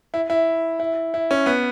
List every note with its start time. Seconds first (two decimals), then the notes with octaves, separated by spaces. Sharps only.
0.14 E4
0.30 E4
0.80 E4
1.14 E4
1.31 C#4
1.46 B3